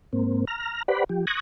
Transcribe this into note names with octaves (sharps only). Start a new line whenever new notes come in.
G#2 A#3 C4
A#5 F6
G4 B4 C5 D5 F#5 B5
F3 G4
C#6 D#6 F#6 G#6 A#6